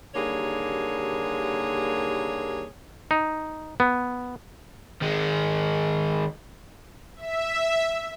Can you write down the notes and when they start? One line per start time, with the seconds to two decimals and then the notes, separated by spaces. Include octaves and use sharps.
0.15 D#2 D3 G3 A#3 G#4 C#5
3.11 D#4
3.80 B3
5.01 D#3 G#3
7.16 E5